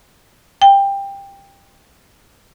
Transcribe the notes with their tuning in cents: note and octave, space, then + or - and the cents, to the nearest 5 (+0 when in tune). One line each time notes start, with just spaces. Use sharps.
G5 +15